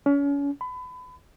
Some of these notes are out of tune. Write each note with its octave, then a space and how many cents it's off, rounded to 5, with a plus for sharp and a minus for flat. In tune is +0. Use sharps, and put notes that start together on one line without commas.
C#4 +35
B5 +30